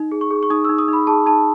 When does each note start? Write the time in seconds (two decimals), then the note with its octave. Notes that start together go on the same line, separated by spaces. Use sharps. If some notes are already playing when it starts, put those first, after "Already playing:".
Already playing: D#4
0.12 G#4
0.21 C#6
0.31 G#4
0.43 C#6
0.50 D#4 D#6
0.64 E6
0.69 D#4
0.78 D#6
0.88 D#4 B5
1.07 G#4 A5
1.26 D#4 A5